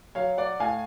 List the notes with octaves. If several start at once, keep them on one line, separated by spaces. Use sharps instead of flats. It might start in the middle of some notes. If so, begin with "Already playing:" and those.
F#3 C#5 F5
D5 F#5
A2 F5 G#5